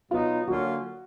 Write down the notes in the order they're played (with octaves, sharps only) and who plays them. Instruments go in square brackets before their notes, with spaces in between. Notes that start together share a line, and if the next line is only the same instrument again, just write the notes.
[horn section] B2 F#3 B3 D#4 [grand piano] F4
[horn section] D3 F#3 A#3 C#4 F4 [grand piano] F#4